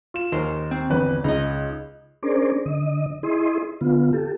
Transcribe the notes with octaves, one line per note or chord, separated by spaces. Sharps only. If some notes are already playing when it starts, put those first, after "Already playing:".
F4 E7
D#2 D#4 A#4 C5
C4
G1 E2 B4
C#2 D#4 D#5
C#4 D4 G#4 A#4 C5 D5
D3 D#5
E4 G#4 D#5 C6
D3 B3 F4
G4 A4